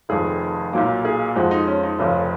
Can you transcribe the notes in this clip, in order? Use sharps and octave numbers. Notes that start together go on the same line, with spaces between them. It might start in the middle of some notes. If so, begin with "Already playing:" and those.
F1 F2 D#3 G#4
B1 A#2 F#3 A#3
G#4
F2 F3 G#3 F#4
D#4
C#4
D#4
F1 F2 C#3 C#4